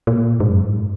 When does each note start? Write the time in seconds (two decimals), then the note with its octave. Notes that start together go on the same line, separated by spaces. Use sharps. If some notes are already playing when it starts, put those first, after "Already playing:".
0.07 A#2
0.40 G#2
0.50 F#2
0.60 G#2